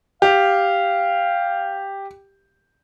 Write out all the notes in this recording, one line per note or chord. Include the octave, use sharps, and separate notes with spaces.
G4 F5